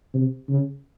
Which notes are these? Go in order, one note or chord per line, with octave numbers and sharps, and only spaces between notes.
C3
C#3